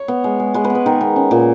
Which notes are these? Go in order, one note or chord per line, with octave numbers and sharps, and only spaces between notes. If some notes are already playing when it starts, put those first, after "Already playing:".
Already playing: C#5
B3
G#3
G#3
G#3 B4
B4
B3
B4
D#3 A#4
B3
C#4
A#2